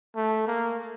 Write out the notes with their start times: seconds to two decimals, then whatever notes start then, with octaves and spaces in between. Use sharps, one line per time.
0.16 A3
0.47 A#3